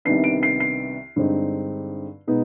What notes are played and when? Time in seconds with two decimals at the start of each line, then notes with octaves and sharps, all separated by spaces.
0.05 C2 C3 D#3 B3 D4 C7
0.24 D7
0.43 C7
0.60 C7
1.16 G2 D3 G#3 C4 D#4
2.27 B2 G#3 B3 D#4